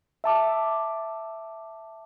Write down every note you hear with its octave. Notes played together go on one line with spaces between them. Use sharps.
E5 A5 D6